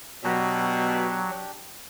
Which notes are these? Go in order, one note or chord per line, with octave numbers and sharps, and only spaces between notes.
B2 F#3 D4 G4